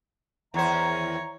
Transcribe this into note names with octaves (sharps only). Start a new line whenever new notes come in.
E2 D#3 C5 C#5 E5 A#5